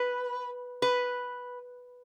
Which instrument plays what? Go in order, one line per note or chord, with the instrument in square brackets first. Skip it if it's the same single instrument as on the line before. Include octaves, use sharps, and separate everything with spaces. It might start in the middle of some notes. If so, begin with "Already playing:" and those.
Already playing: [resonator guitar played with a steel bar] B4
B4